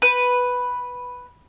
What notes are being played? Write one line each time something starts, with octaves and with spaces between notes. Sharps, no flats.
B4